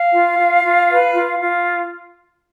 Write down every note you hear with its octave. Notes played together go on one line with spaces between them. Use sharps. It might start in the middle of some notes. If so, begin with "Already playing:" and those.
Already playing: F5
F4
F4
F4
B4
F4
F4